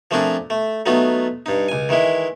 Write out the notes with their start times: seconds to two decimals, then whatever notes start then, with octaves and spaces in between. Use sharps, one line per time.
0.11 F3 A3 C4 D4 G#4 A#4
0.50 A3
0.86 F#3 A3 B3 D#4 F4
1.46 G2 D#4
1.69 C#2 G#5
1.89 D#3 E3 G#3 E4